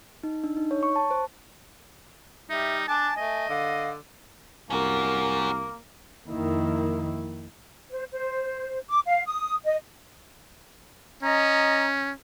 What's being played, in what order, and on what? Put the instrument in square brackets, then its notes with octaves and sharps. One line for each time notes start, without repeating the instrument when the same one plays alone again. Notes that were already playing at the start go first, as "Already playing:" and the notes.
[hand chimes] D#4
D4
D#4
C#5
C#6
A5
C5
[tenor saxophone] G3 [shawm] D#4 [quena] E5
[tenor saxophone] D4 [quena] G#5 [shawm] A5
[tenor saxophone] A3 [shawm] D#5
[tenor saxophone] D3 [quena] F5
[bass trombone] C2 [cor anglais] A#3 [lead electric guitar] C#4 F#4 [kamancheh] A#4
[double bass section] F2 D#3 [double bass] A#3 E4
[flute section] C5
C5
D6
F5
D#6
D#5
[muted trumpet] C#4 [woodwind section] D#5 A#5